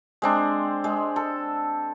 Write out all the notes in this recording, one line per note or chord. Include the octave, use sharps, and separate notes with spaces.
G#3 C4 D4
G#3
A4